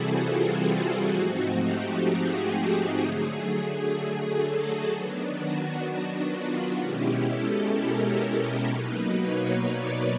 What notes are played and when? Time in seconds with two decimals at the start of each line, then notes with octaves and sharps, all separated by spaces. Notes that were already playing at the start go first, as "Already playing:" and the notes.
Already playing: C3 E3 G3 C4 E4 F#4 G#4 A4
0.14 F4
1.08 G#2 F3 A3 C4 D#4 F#4
1.56 G4
2.03 G#4
2.51 G4
2.97 D3 F#3 A3 G#4
3.46 G#4
3.92 G#4
4.24 A4
4.55 F#4
4.87 D#3 F#3 B3 D4
5.34 F#4
5.82 F#4
6.29 F4
6.77 B2 G#3 C#4 E4 G4
7.24 A4
7.71 A#4
8.18 A4
8.66 B2 F#3 A#3 D#4 B4
9.14 C#5
9.60 D5